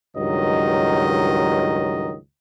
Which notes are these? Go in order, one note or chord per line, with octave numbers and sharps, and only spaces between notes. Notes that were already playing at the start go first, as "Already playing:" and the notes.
C#2 G2 D#3 F#3 D#5